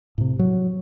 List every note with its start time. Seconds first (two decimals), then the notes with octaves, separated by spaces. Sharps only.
0.18 A2 C3
0.39 F#3